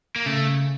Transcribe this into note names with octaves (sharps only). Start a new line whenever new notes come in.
A#3
C#3 A3